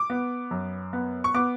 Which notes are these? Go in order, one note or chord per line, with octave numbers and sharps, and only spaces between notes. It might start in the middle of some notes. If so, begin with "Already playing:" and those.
Already playing: D6
B3
F#2
B3
C#6
B3 D6